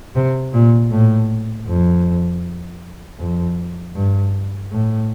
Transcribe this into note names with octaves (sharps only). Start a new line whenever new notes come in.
C3
A#2
A2
F2
F2
G2
A2